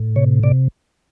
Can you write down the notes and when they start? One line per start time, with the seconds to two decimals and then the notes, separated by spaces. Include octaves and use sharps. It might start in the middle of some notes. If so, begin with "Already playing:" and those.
Already playing: A2
0.16 C3 C#5
0.43 C3 D5